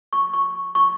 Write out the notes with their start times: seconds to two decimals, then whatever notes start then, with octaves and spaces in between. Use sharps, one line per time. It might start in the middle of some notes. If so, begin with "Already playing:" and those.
0.13 C#6
0.33 C#6
0.75 C#6